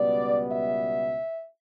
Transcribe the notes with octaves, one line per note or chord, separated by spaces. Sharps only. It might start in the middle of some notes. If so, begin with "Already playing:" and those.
Already playing: C#2 B2 G3 B3 D5
E5